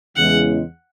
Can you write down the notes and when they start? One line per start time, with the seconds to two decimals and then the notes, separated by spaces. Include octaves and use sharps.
0.16 E2 C#3 E3 G#3 F#5